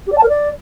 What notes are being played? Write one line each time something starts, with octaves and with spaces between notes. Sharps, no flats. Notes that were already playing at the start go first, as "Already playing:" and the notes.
G4
D5
A5
A#4
D5